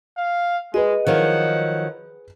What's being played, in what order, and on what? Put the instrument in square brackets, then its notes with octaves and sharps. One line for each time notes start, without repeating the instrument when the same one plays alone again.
[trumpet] F5
[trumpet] G#3 [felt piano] G#4 B4 [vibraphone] D#5
[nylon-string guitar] D#3 F3 F#3 [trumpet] F#5